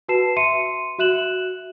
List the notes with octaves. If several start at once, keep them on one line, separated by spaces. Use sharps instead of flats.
F#4 B4 A5 C7 E7
E5 C6 C#7 D#7
F#4 E5 F#6 E7 F#7